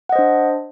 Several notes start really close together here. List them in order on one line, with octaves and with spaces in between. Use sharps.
F#5 D#5 C5 D4